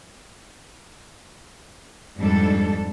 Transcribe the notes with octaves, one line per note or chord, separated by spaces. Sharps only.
F2 G#2 G3 D4 A4